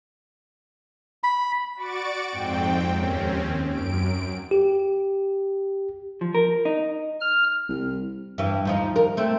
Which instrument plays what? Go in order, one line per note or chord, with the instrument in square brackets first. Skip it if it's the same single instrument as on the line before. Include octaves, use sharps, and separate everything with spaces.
[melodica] B5
[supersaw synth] F#4 D5 C#6 A6 D7
F2 G#2 C4 G5
D#2 C4 C#4
F#2 D7
[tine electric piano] G4
[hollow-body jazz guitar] F3
A#4
D#4
[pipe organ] F6
[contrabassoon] C2
[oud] G2 E3
D#2 F3 D#4
A#4
A3 C4